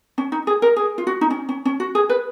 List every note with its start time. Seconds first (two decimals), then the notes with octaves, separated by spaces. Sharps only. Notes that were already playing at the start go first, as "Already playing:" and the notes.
0.18 C#4
0.32 D#4
0.47 G#4
0.62 A#4
0.76 G#4
0.98 F4
1.07 F#4
1.21 D#4
1.30 C#4
1.49 C#4
1.65 C#4
1.80 F#4
1.95 G#4
2.10 B4